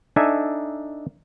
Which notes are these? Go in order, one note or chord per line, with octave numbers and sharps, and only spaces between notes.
D4 D#4 A4 E5 G#5